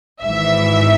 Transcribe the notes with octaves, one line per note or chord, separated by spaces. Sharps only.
G#1 G#2 E3 E5